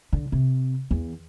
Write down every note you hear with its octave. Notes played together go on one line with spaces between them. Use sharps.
D3
C3
E2